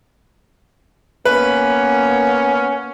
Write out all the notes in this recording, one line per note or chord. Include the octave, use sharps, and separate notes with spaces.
A#3 B3 C#4 B4